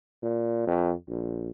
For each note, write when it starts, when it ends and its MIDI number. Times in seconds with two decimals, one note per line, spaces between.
0.23 0.63 46
0.67 0.93 41
1.08 1.49 34